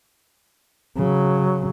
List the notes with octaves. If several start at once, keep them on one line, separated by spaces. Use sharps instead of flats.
C#3 F#3